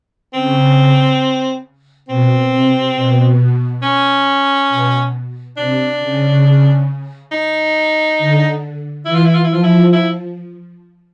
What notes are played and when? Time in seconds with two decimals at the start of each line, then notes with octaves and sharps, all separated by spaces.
0.33 C#3 C4
2.08 B2 C4
2.52 C3
2.95 B2
3.82 C#4
4.69 B2
5.57 C3 D4
6.01 C#3
7.32 D#4
8.18 D3
9.06 E3 E4
9.15 F4
9.25 E4
9.35 F4
9.44 E4
9.49 F3 F4
9.64 E4
9.93 E4